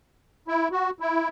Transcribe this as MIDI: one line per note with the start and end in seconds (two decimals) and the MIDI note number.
0.48 0.68 64
0.72 0.90 66
1.00 1.28 64